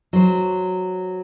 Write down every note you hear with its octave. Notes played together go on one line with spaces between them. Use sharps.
F#3 C5